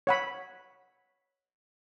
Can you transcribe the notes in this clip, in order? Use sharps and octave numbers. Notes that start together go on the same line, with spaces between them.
C#5 F#5 B5